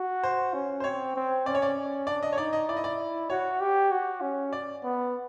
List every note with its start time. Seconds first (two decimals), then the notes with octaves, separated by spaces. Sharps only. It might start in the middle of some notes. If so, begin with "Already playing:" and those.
Already playing: F#4
0.23 C5
0.54 C#4
0.80 C5
0.84 C4 C#5
1.16 C4
1.46 C#4 D5
1.55 C#5
1.62 D5
2.07 D4 D5
2.23 D#5
2.32 C#5
2.38 D#4 D5
2.53 D#5
2.69 E4 D5
2.77 D#5
2.84 D5
3.30 F#4 C#5
3.60 G4
3.91 F#4
4.21 C#4
4.53 D5
4.84 B3